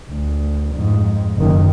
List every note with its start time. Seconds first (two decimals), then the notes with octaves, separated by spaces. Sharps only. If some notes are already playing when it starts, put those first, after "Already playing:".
0.10 D2
0.75 F2 G#2
1.37 F#1 D#3